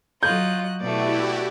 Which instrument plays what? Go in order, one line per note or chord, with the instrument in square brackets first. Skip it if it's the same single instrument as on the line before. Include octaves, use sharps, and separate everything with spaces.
[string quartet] F#3 D#5 F#6 [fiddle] F4 [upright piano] G6
[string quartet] B2 A3 [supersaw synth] E4 F#4 G4 [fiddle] D5